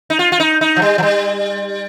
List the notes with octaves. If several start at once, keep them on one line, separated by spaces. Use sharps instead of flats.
D#4
F4
F4
D#4
D#4
F3
G3
F3
G3